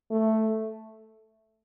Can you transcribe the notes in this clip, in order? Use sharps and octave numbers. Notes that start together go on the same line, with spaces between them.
A3